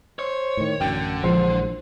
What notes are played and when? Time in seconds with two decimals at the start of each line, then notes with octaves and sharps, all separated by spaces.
0.19 C5 C#5
0.57 A2 D#3
0.81 A1 F#2 D3 G5
1.24 A#1 E3 F3 G#3 C5